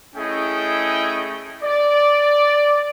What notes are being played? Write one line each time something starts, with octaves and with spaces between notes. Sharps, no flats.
A3 C#4 E4 G#4 D#5 G5
D5